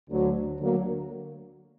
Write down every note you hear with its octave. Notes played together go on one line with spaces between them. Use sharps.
D2 D3 F#3
D2 D3 F#3 A#3